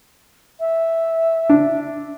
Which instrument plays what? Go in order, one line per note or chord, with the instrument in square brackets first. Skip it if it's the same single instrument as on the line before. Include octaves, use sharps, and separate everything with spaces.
[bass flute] E5
[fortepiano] D4